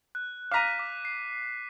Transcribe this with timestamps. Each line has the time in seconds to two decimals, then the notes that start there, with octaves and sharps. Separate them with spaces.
0.15 F#6
0.51 F5 A#5 D6 B6 D#7
0.79 D6
1.05 C7